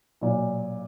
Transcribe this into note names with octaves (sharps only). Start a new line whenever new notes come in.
B1 A#2